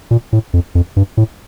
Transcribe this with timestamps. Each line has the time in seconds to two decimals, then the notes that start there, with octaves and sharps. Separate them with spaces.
0.11 A#2
0.33 A2
0.54 F2
0.75 F2
0.96 G2
1.17 A2